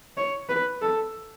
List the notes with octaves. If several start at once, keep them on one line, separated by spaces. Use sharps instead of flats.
C#5
B4
A4